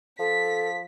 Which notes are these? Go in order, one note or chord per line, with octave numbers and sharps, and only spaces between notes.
F3 A4 B6